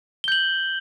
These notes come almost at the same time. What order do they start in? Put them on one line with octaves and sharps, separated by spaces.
G7 G6 F#7